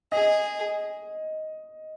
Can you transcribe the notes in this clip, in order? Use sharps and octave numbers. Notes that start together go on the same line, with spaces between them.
G#4 D#5